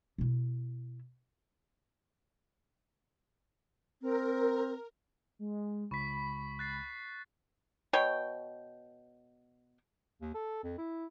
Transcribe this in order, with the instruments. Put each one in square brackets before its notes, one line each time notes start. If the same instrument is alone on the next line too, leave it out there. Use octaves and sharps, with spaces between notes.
[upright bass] B2 E4
[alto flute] C4 [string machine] A#4
[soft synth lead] G#3
[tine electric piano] C#2 [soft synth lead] B5 [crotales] C#6 B6
[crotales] F#6 A6 C7
[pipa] B2 C#5 G5
[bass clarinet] D#2
A4
F2
E4